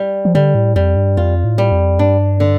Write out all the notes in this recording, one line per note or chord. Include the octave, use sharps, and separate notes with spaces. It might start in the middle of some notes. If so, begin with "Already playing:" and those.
Already playing: G3
F3
D3 G3
A2
F2 G3
G2
F2 F4
A2
G3
F2
G2 D4
D3